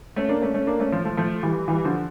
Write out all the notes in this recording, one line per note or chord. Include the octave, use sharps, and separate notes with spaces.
A3 C#4
A#3 D4
A3 C#4
A3 C#4
A#3 D4
A3 C#4
F3 A3
F3 A3
F3 A3
E3 G3
E3 G3
D3 F3